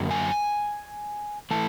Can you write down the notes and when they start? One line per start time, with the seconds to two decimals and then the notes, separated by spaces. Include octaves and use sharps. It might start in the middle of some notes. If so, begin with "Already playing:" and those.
Already playing: F#2 D3 F#3 A#3
0.11 G#5
1.51 E3 A3 A5